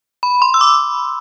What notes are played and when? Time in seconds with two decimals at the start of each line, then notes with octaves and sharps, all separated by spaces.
0.23 B5
0.42 C6
0.54 E6
0.61 D6